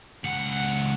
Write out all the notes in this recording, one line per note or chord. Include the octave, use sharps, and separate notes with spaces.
C#2 F#5